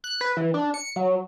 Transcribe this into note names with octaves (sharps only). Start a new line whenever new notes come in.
F#6
B4
E3
D4
C#7
F#3